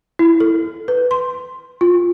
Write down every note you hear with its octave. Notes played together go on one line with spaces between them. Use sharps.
E4
A4
B4
C6
F4